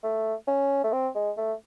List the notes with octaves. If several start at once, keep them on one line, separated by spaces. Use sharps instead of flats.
A3
C#4
A3
C4
G#3
A3